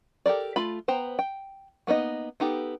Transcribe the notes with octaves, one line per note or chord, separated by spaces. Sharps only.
G4 A4 A#4 D5
A3 F4 B5
B3 C5 G5 A#5
G5
A#3 B3 D#4 D#5
B3 D#4 G4 A4